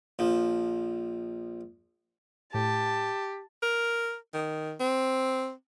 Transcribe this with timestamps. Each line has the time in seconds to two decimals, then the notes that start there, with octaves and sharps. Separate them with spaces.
0.19 A#1 F3
2.54 A2 G4 A5
3.62 A#4
4.34 D#3
4.80 C4